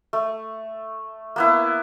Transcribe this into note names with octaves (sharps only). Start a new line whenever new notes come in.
A3
A#3 B3 E4